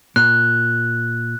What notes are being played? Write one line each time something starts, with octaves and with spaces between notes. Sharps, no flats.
A#2 F#6